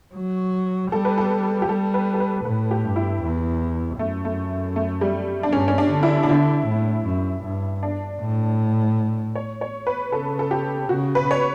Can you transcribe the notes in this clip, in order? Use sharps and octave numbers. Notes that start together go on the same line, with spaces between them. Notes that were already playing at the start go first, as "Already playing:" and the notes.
F#3
G3 A4
B4
A4
G4
G3 A4
B4
A4
B4
A2 B4
G4
G2
E4
E2
F#2 A3
A3
A3
G3
D4
G2 C#4
C#4
D4
D3
E4
D4
D3 E4
A2
F#2
G2
D4
A2
C#5
C#5
B4
C#3 A4
A4
G4
C#3 F#4
B4
C#5